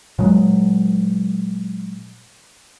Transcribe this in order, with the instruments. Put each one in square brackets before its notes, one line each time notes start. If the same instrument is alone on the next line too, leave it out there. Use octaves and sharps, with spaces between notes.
[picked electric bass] A#2 F#3 G#3